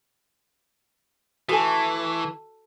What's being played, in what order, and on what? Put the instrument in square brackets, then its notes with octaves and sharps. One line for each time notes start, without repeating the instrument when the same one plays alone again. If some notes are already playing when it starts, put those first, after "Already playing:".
[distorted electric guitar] E3 [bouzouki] A3 [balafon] F#4 A4 G#5